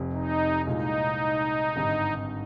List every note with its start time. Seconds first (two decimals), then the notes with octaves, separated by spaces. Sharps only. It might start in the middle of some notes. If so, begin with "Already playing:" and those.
Already playing: F1 F2 C3
0.12 D#4
0.66 C2 A#2 G#3 D#4
1.76 G#1 G2 D3 G3